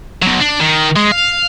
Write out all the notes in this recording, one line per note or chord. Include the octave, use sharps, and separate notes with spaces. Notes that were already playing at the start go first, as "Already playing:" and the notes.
B2 F#3
D4
D#3
G#3
F5